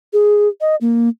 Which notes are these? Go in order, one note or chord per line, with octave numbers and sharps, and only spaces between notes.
G#4
D#5
A#3